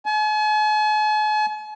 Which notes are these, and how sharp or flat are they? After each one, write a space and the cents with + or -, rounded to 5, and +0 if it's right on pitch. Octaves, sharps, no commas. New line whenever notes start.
G#5 +45